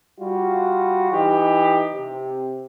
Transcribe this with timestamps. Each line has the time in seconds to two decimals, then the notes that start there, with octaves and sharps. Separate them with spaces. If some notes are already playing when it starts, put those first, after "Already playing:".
0.19 G3 F4 F#4
1.11 E3 D#4 G4
1.93 C3